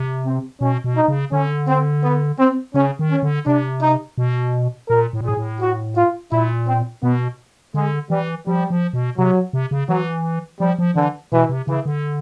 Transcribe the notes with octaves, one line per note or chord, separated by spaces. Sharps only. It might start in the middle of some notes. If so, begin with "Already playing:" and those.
Already playing: C3
C4
B2 C#4
B2
D#4
C#3
D3 C#4
C4
B3
C4
C#3 C#4
D#3
C#4
D3
C3 D4
D#4
B2
A#2 A#4
A2
A#2
A2 G#4
A2
F#4
F4
A#2 E4
C4
B2 B3
D3 G#3
E3 G3
F3 G3
F3
B2
C3 F#3
C3
C#3
E3 F#3
F3 G3
F3
D3 E3
B2 E3
C3
C#3 E3
D3